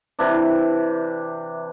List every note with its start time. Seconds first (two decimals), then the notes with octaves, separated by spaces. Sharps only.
0.19 C3 E3 D4